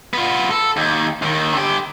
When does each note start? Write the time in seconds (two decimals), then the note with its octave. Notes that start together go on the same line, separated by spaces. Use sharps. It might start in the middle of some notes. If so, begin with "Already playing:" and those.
0.14 B3 F4
0.51 A4
0.77 D#2
1.22 D#2 D#3
1.53 D3 G4